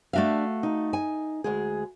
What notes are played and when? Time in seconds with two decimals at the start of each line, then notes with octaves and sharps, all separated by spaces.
0.13 A3 D4 F#4 E5 F5
0.63 D#4
0.93 G#5
1.44 D2 G#3 G#4